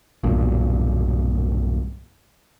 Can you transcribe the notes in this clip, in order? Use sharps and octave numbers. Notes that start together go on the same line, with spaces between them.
B1 E2 G2 A#2